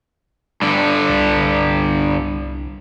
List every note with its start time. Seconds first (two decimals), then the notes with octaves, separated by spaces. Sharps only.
0.62 G2 D3
1.09 C2